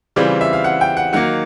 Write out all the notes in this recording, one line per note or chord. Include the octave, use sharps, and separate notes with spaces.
C#3 E3 G3 C4 F4 D5
E5
F5
F#5
G5
F#5
D#3 F#3 A#3 F#5